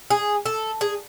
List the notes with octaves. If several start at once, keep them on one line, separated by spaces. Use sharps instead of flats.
G#4
A4
G#4